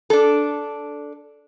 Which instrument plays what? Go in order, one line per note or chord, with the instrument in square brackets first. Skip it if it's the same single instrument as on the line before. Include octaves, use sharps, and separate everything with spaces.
[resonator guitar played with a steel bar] D4 A4